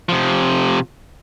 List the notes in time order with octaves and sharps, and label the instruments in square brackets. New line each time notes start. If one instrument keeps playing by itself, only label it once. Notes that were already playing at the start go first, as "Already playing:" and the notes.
[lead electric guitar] C3 F3